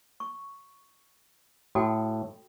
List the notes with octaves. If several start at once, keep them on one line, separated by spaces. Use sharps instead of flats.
C#6
A2 F#4 A4 G5